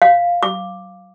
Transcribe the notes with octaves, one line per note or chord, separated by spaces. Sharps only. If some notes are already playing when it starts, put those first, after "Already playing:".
F5
D6